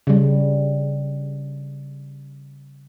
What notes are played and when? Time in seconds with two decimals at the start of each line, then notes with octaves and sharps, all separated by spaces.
0.07 C#3 G3